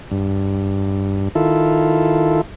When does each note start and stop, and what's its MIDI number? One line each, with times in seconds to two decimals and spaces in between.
0.11 1.29 43
1.35 2.41 51
1.35 2.41 64
1.35 2.41 65
1.35 2.41 69